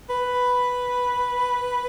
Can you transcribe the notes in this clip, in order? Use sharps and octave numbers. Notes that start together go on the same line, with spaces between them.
B4